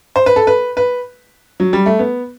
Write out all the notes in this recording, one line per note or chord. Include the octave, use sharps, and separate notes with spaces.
C5
B4
A4
B4
B4
F#3
G3
A3
B3